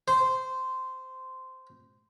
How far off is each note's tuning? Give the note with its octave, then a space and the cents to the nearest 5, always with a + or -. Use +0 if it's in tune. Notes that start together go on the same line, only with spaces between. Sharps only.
C5 -10